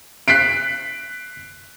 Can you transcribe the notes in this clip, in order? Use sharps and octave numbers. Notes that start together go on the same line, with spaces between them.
F#6 B6 C7 D7